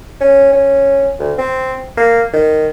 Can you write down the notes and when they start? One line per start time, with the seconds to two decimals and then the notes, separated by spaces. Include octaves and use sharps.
0.20 C#4
0.52 C#4
1.19 D2
1.38 C4
1.97 A#3
2.33 D#3